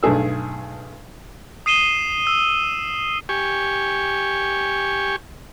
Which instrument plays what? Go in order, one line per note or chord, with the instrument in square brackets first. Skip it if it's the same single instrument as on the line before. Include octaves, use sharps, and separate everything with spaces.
[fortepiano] B1 G2 A3 G#4 E6
[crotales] D#6 C7 D#7 E7 G7
E6
[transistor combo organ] G4 G#5 C#6